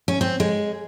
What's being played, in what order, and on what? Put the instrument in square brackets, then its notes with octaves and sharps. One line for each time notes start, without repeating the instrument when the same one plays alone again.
[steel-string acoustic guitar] C#4
C4
G#3